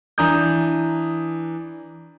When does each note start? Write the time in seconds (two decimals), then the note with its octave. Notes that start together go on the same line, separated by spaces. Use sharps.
0.18 E3 D4 A#5 D#6 G6